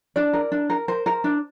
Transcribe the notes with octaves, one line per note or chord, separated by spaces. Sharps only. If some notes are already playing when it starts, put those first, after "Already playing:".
D4 D5
A#4
D4
A#4
A#4 C5
A#4
D4